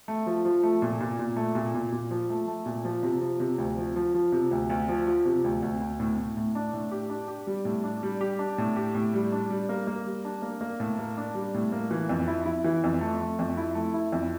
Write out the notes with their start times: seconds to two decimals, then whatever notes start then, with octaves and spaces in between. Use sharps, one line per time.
0.08 A3
0.26 F3
0.45 F3
0.63 A3
0.82 A#2
1.01 A#2
1.19 A#2
1.36 A3
1.55 A#2
1.75 A#2
1.93 A#2
2.11 F3
2.30 A3
2.48 A3
2.66 A#2
2.85 F3
3.03 C3
3.21 F3
3.40 C3
3.58 D2
3.78 F3
3.96 F3
4.14 F3
4.32 C3
4.51 D2
4.70 D2
4.88 F3
5.07 F3
5.25 C3
5.44 D2
5.63 D2
5.80 D2
6.00 A2
6.17 A2
6.37 A2
6.55 D4
6.74 A2
6.91 G4
7.10 D4
7.28 G4
7.47 G3
7.65 A2
7.84 D4
8.03 G3
8.21 G4
8.39 D4
8.58 A2
8.76 G4
8.95 A2
9.14 G3
9.32 D4
9.50 G3
9.69 A#3
9.87 A#3
10.06 G3
10.25 D4
10.42 A#3
10.61 A#3
10.80 A2
10.99 A#3
11.17 D4
11.35 G3
11.54 A2
11.72 A#3
11.91 E3
12.09 F2
12.28 E4
12.46 E4
12.64 E3
12.84 F2
13.01 A3
13.21 A3
13.39 F2
13.57 E4
13.75 A3
13.94 E4
14.13 F2